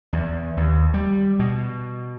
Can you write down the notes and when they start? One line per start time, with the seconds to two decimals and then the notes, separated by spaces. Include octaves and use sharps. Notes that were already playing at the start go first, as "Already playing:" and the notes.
0.13 E2
0.57 D#2
0.94 G3
1.39 B2